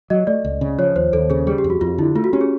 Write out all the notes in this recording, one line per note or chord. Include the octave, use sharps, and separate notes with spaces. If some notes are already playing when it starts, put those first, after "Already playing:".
F#3 D#5
A3 D5
C#2
C#3
F3 C#5
D#2 C5
D#2 A4
C#3 G#4
G3 G#4
G4
F2
F#4
F2 F4
D3 E4
A3 F4
F#4
C#4 G4
G#4